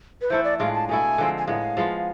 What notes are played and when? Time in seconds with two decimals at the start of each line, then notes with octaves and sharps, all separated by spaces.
0.22 B4
0.30 E3 A3 E4 C5
0.44 D5
0.59 A2 G#3 D4 F4 F5
0.75 A5
0.88 B2 A3 E4 G#5
1.18 D3 F3 G#3 C4
1.38 G#5
1.47 A2 G#3 B3 F5
1.77 F3 G#3 B3 F4